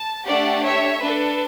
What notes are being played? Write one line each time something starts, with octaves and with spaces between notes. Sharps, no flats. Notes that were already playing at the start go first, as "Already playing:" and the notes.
Already playing: A5
A3 D4 G4 D5 F#5
C#5 E5
D4 A4 B4